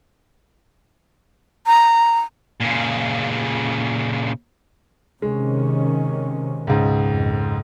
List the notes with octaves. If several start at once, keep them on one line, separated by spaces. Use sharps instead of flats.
A#5
A#2 C#3
C3 D#3 G#3 C#4
C#2 G#2 B2
F2 A#2